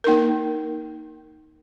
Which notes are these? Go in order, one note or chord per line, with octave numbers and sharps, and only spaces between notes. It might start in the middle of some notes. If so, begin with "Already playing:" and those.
A#3 D#4 A#4